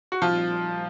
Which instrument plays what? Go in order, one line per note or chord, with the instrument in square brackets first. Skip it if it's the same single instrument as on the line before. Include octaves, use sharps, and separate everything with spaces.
[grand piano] F#4
[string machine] A#2 G3 C4 D#4 [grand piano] F3 F4